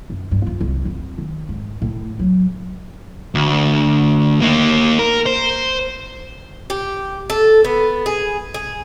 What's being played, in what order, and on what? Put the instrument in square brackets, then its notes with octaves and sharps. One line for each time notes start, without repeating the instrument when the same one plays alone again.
[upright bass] F#2
G2
F4
C2
F2
D#3
G#2
A2
F#3
[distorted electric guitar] D2
A#3 D#4
A#4
C5
[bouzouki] G4
A4
B3
G#4
G#4